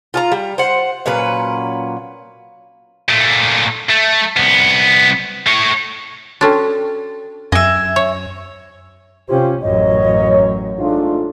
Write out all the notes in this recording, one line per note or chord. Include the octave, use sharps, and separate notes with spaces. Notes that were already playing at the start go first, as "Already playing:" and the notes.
F4 A5 A#5
G3
C5 F#5
A#2 F#3 C#4 B4
A#2 A3
A3
C2 B3
A3 C#5
C#4 D4 F#4 A4 G5
F#2 D#5 E5 G#5
C#5
C3 C#4 F4 G4 C5
A1 F#2 C#5 D#5
G#2 A3 D4 F4